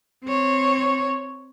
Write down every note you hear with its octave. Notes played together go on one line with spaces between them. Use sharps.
C4 C#5